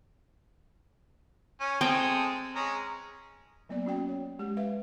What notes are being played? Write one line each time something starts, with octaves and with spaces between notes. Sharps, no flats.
C#4
G#3 C4 G#4 A4 G5
G#3 C#4 A#5
F#3 A#3 B3 D5
C#4 F#4 G5
C#5
G#3 G4
B4 E5 F5